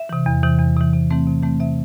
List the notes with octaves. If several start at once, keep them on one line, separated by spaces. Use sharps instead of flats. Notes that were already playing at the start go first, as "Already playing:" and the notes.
Already playing: E5
C3 E3
E2
C3 E3
E2
C3 E3
C3
E3 A3 C4
C3
E3 A3 C4
C3 E5